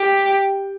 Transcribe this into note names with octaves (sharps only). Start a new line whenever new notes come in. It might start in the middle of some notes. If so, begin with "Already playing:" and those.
Already playing: G4